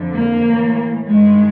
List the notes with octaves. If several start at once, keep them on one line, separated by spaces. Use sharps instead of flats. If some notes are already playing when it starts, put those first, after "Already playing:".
Already playing: F2 D3
A#3
A2 E3
G2 D#3 G#3